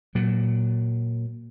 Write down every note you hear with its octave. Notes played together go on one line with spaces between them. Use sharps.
A#2 F#3